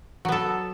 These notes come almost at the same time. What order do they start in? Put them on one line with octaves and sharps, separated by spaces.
F#3 B3 A4